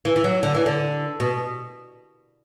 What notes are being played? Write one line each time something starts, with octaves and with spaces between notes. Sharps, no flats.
E3
E3
F#3
D3
E3
D3
B2